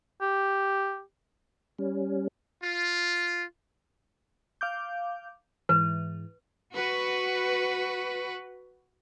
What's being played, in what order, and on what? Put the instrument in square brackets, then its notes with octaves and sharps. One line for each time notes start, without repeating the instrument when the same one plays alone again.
[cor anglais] G4
[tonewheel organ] G3 C#4
[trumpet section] F4
[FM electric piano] F5 D6 G6
[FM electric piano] G#2 E3 [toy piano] B4
[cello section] F#4 B4